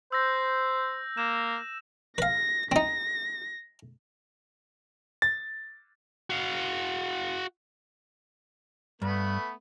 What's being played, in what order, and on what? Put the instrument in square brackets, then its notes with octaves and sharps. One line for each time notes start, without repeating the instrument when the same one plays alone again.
[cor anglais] C5 [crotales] E6 G6 A#6
[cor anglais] A#3 [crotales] E7
[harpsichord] B4 F5 [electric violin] A#6
[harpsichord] C4 D#4 [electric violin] A#6
[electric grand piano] A6
[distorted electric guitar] F#4 F5
[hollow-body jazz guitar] G2 [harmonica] A3 B3 B4